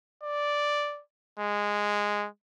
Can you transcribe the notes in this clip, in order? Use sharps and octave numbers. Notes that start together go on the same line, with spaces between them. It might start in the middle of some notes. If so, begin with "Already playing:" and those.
D5
G#3